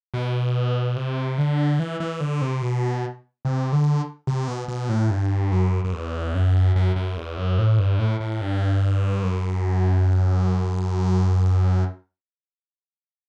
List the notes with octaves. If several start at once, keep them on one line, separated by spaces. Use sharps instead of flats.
B2
C3
D3
E3
E3
D3
C3
B2
C3
D3
C3
B2
B2
A2
G2
F#2
F#2
E2
F#2
F#2
F#2
E2
F#2
A2
G2
A2
A2
G2
F#2